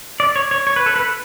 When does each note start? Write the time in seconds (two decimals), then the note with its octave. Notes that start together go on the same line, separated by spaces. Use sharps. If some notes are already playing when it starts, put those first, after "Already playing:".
0.20 D5
0.36 C#5
0.51 C#5
0.67 C#5
0.76 B4
0.86 A4
0.96 B4